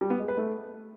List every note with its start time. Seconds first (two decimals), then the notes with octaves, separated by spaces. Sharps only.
0.01 G3
0.10 B3
0.19 G#3
0.28 B4
0.37 A3